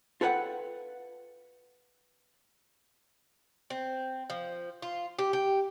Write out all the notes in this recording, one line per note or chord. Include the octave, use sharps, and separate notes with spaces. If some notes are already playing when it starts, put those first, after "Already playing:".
F4 A4 B4 C#5 F#5 G5
C4
F3
F4
G4
G4